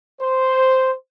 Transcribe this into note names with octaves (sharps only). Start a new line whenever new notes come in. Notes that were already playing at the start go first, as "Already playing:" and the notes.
C5